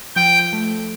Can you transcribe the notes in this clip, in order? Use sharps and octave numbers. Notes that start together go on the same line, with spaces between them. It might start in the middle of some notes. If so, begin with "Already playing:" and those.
F3 G5
A3